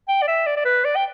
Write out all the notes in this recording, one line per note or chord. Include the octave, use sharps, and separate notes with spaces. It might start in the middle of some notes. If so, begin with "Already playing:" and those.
G5
D5
E5
D5
D5
B4
D5
G5